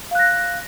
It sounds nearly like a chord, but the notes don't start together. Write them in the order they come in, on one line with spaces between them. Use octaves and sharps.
F5 F#6 A#6